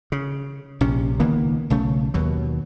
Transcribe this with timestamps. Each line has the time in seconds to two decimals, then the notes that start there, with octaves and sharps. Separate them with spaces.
0.12 C#3
0.81 A#1 C3 C#4
1.20 C#2 D#3 A#3 B3
1.70 B1 C#3 A3
2.14 D#2 B2 F#3